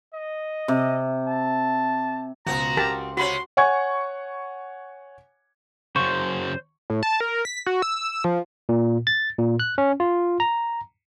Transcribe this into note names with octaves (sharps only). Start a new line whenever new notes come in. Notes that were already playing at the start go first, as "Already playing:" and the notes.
D#5
C3
A5
C#2 B2 C4 F#4 A#5
C#2 G4 A#4 A5
C3 C#4 F#4 B5 C6
C#5 F#5 G#5 C#6 G#6
F#2 C#3 C5 C#6
A2
A5
A#4
B6
F#4
E6
F3
A#2
A6
A#2
F#6
C#4
F4
A#5